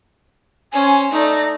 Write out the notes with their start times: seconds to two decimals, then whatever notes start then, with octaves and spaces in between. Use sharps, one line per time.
0.73 C#4 C5 G#5
1.11 A3 D#4 D5